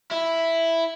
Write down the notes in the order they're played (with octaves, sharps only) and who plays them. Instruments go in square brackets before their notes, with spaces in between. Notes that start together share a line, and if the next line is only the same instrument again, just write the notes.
[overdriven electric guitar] E4